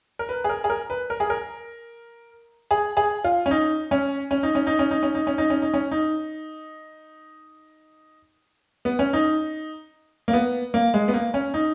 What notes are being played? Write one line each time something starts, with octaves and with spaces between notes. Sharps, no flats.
A#4
B4
G#4
A#4
G#4
A#4
B4
A#4
G#4
A#4
G#4
G#4
F4
C#4
D#4
C#4
C#4
D#4
C#4
D#4
C#4
D#4
C#4
D#4
C#4
D#4
C#4
D#4
C#4
D#4
B3
C#4
D#4
A#3
B3
A#3
G#3
B3
A#3
C#4
D#4